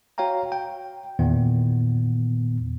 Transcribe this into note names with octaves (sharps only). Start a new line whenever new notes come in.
F#4 C#5 F5 G5 A#5
G5
E2 A#2 D#3 B3